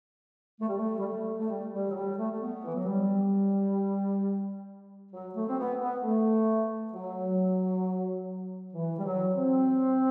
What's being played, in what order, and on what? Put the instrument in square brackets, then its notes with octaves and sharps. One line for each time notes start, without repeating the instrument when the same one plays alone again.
[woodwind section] A3
G3
A3
G3
A3
A3
G3
G3
F#3
G3
A3
A3
B3
E3
F#3
G3
F#3
A3
C4
B3
B3
A3
F#3
E3
G3
F#3
C4